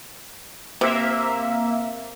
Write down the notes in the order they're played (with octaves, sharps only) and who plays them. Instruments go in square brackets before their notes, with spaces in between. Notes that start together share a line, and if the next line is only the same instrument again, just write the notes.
[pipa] C3 [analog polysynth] A#3 E5